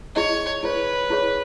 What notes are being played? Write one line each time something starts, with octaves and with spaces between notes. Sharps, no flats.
E4 G#4 C#5 D#5
E4 G#4 B4 C#5
E4 G#4 C#5